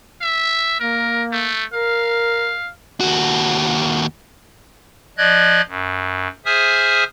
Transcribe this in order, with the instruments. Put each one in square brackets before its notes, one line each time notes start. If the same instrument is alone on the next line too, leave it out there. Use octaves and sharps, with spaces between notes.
[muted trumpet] E5
[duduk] A#3 [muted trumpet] A#4
[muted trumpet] A3
[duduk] A#4 [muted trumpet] F5
[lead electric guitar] D#2 F#4
[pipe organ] F3 D5 D#5 F#6 G#6
F#2
G#4 C5 E5 G#5 D#6 F6